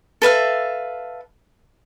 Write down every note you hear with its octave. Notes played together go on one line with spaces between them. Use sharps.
A4 B4 E5 F5